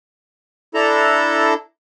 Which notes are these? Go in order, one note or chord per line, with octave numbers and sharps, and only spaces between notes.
D4 E4 A4 A#5